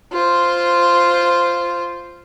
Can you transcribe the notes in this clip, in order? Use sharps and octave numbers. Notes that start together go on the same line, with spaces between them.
F4 C5